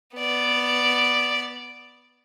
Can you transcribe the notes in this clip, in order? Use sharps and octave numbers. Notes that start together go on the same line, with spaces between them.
B3 D5